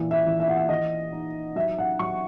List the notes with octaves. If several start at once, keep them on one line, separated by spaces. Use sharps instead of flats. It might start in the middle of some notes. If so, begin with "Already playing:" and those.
Already playing: A#2 E3
E5
E3
E5
F#5
E5
E3 D#5
D#4
F#3 E5
F#5
F#3 C#6